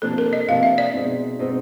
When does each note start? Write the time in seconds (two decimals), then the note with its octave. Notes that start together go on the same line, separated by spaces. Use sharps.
0.02 C3 F3 A#3 D4 A4
0.18 A#4
0.33 D#5
0.48 C3 F3 A#3 D4 F5
0.63 E5
0.78 D5
0.94 B2 G#3 C4 D#4
1.39 B2 G#3 C4 D#4